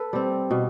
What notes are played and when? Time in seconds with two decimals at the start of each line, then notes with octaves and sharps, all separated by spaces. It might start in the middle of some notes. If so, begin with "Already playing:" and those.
Already playing: A4 B4
0.13 G3 C4
0.51 B2